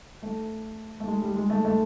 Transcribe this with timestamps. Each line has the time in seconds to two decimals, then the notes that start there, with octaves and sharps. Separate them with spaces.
0.22 A3
1.00 A3
1.07 G#3
1.22 G3
1.36 G#3
1.50 A3
1.65 A3